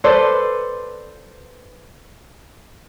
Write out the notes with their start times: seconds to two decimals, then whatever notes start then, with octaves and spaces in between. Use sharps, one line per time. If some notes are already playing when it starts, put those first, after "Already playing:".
0.04 A4 B4 C5 D5